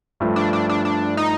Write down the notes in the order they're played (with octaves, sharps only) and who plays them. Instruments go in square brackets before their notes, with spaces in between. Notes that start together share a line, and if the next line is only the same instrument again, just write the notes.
[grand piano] G2 F3 A3
[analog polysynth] D4
D4
D4
D4
D#4